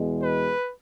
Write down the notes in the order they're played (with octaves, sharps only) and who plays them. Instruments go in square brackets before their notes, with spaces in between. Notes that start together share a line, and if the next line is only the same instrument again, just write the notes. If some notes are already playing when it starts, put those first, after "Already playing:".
Already playing: [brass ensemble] E2 B2 G#3
B4